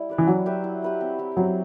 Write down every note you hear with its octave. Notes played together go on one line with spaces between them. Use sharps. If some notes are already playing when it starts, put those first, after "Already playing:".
Already playing: G3 E4
G4 B4 D5
E3
F#3 E4
G4 B4 E5
E4
G4 B4 E5
C4
E4 G4
F#3 C4